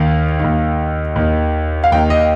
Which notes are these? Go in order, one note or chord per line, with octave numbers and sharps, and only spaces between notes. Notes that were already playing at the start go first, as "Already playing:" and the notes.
Already playing: D#2 D#3 F5
D#2 D#3
D#2 D#3
F5
D#2 D#3 G5
D#5